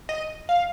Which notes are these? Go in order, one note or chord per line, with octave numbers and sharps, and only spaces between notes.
D#5
F5